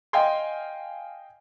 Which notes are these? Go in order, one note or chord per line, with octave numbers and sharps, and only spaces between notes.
D#5 F5 G5 G#5 C6